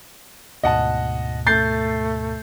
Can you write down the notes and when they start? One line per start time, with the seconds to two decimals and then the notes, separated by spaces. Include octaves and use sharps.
0.63 D2 G#2 B2 D#5 F#5 A5
1.47 A3 G6 A6 C7